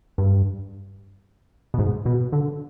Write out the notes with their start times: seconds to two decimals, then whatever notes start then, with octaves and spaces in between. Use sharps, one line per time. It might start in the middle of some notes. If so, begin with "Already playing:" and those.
0.18 G2
1.74 B2
1.79 G#2
2.06 B2
2.32 D3